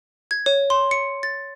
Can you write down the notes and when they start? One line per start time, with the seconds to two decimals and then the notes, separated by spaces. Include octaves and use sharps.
0.31 G#6
0.46 C#5
0.70 C6
0.91 C#7
1.23 A6